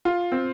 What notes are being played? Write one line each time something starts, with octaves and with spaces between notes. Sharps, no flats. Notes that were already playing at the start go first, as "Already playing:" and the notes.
F4
C4